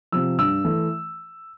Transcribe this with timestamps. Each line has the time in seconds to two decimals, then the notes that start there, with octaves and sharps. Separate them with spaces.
0.12 C3 F3 E6
0.38 G2 E6
0.65 E3 A3